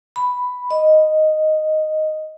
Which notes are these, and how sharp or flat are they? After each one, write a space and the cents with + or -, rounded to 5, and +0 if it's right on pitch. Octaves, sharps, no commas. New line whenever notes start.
B5 +5
D#5 -5